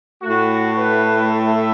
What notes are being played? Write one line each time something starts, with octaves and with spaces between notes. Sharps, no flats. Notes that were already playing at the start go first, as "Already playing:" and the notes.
A2 A3 F#4
B4
E5